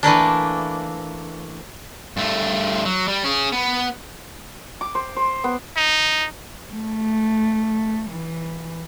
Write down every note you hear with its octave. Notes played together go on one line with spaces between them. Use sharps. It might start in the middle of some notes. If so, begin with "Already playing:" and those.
E3 A3 A#3 D4
G2 A3
F#3
G3
C#4 G#4
B3
D6
C5
C5
B3
D#4
A3
E3